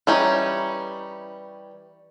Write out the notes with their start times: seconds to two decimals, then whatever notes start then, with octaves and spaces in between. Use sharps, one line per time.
0.07 E3 G3 C#4 D#4